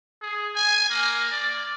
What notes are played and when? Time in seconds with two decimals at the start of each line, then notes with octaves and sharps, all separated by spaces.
0.22 G#4
0.56 G#5
0.90 A#3
1.32 D5